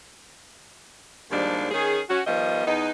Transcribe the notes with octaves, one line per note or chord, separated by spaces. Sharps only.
D#2 G#2 F3 G3 D4
D#3 C#4 G#4
C#4 F#4
D#3 F3 G3 B3 D#5
E2 B3 D#4